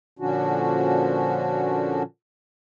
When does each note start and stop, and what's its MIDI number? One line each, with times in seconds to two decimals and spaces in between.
0.19 2.03 46
0.19 2.03 50
0.19 2.03 53
0.19 2.03 61
0.19 2.03 62
0.19 2.03 66